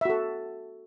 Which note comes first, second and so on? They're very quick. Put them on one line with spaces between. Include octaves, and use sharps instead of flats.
E5 F#4 A4